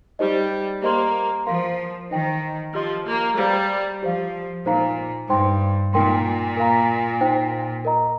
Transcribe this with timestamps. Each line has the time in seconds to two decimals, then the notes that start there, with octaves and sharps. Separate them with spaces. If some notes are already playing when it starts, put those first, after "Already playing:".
0.19 G3 D#4 G4 C5 D#5
0.83 A#3 G4 C5 D#5 C6
1.47 F3 A#4 F5 C6
2.11 D#3 D#4 C5 G5
2.74 F3 G4 D#5 C6
3.07 A#3
3.38 G3 C5 F5 A#5
4.02 F3 G4 C5 F5
4.66 A#2 D#4 C5 F5 A#5
5.30 G2 D#4 C5 G5 C6
5.93 A#2 D#4 A#4 G5 C6
6.57 A#4 F5 A#5
7.21 D#4 C5 G5
7.85 A#4 D#5 A#5